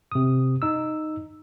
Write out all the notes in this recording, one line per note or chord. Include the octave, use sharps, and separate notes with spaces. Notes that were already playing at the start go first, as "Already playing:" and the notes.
C3 D#6
D#4 E6